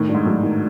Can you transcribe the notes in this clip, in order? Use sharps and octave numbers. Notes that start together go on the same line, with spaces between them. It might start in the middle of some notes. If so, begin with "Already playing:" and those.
Already playing: A2 D#3
G2
G#2
A2 F#3
D#3